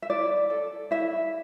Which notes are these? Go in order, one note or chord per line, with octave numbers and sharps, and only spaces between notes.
E5
E4 D5
A4
E4 E5